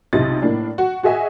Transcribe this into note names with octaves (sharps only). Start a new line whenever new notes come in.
B1 C3 E4 F4 D#5 A6
A2 A#3 D4
F#4
F#4 G#4 D#5 E5 G#5